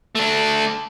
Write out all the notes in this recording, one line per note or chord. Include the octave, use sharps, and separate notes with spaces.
A3 D4